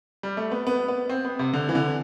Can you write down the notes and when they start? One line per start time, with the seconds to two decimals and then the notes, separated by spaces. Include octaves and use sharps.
0.23 G3
0.37 A3
0.52 B3
0.67 B3
0.88 B3
1.10 C4
1.25 B3
1.39 C3
1.53 D3
1.69 E3
1.75 D3